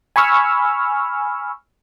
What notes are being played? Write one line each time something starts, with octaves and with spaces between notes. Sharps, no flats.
G#5 B5 C#6 E6 F6